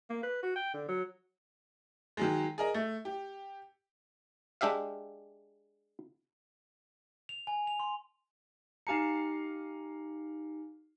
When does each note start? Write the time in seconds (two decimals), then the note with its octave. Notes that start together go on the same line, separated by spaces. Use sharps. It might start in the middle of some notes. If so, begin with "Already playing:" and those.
0.10 A#3
0.23 B4
0.43 F#4
0.56 G5
0.74 D3
0.88 F#3
2.17 D#3 F#3 G#3
2.58 G#4 A#4 D#5
2.74 A3
3.05 G4
4.61 G#3 D4 G4 E5 F5
7.29 F7
7.47 G#5
7.67 F7
7.80 C6
8.87 D#4 G4 F5 G#5 A#5 C#7